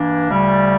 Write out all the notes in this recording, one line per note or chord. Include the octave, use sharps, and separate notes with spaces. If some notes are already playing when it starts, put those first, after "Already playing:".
Already playing: G2 E3 A#3 D4
D2 C#3 G3